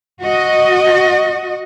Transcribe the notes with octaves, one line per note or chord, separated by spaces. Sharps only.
F#4 D#5